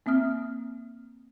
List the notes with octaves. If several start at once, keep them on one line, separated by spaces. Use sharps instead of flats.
A#3 C4 E5 D#6 F6